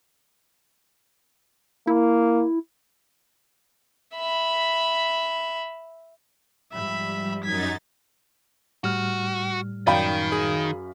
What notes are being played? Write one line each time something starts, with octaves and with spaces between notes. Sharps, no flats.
A#3 E4
E5 B5
G#2 F3 G3 E5 B5
F#2 D#4 G#6 A6 B6
A2 G3 F#4 F6
F#2 D#3 D5 F5 G5 B5
G#4